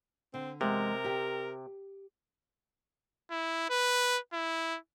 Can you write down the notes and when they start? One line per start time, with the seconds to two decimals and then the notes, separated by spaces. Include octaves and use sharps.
0.34 D3 C4
0.61 E2 C3 G#3 G#4 A#4
1.04 G4 G5
3.31 E4
3.70 B4
4.33 E4